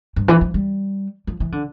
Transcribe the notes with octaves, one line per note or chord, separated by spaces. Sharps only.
G2
E3
F3
G3
F3
E3
D3